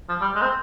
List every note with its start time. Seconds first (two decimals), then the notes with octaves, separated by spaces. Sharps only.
0.09 F3
0.21 G3
0.35 G#3
0.42 C4